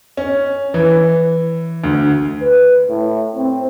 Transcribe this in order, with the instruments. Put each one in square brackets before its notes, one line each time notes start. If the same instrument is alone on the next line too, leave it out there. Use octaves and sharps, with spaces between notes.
[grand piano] C#4
E3
D2
[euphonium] B4
A2
C4